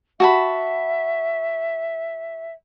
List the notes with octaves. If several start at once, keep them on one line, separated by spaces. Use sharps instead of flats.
F#4 E5 A5 B5